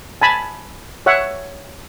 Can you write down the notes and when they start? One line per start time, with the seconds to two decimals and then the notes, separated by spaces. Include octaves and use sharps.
0.21 G#5 A5 B5
1.06 C#5 E5 F#5